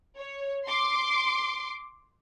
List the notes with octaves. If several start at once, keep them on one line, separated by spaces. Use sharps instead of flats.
C#5
C6 D6